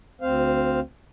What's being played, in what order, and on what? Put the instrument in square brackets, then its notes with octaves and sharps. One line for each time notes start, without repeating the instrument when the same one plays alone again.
[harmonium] D2 C4 C5 F5